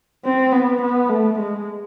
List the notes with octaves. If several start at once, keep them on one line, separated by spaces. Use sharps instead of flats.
C4
B3
B3
A3
G#3